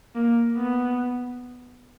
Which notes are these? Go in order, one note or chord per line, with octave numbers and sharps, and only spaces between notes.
A#3
B3